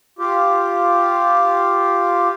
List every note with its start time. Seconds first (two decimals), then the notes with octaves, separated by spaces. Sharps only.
0.19 F4 G4